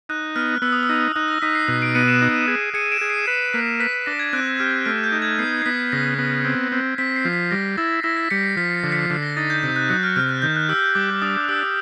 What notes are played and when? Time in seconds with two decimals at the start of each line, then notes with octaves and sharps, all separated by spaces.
0.09 D#4 F#6
0.36 B3 F6
0.62 B3 E6
0.72 D#6
0.83 E6
0.89 D#4
1.16 D#4 F#6
1.28 A#6
1.42 D#4 B6
1.55 C7
1.68 B2 C7
1.82 C7 D7
1.95 B3 C#7 D#7
2.08 D7 E7
2.22 D#4
2.48 G#4
2.74 G#4 C#7 D#7
2.92 D7 E7
3.01 G#4
3.10 C7 D7
3.27 B4 C7
3.53 A#3 B6
3.80 B4 B6
3.93 B6
4.06 D4 A#6
4.19 G#6
4.33 C4 F#6
4.59 G4 F6
4.86 A3 F6
5.04 G6
5.12 D#4
5.22 G#6
5.39 B3 C7
5.62 C7
5.66 B3 B6
5.92 C#3 A#6
6.18 B3
6.45 C4
6.72 C4
6.98 C4 B6
7.16 C7
7.25 F3
7.33 B6
7.51 G3 A#6
7.78 E4 A6
8.03 E4 A#6
8.17 B6
8.30 G3 B6 C#7
8.43 C7
8.57 F3 B6
8.75 C7
8.84 D3
8.92 B6 C#7
9.10 D3 C7
9.23 A#6
9.37 D#4 A6
9.50 G6
9.63 C3 G6
9.76 F#6
9.89 F#3 F#6
10.03 F6
10.16 C3 F6
10.29 F#6
10.42 D#3 G6
10.56 F#6
10.69 G4 E6
10.95 G3 D6
11.22 D4 D#6
11.49 G4 E6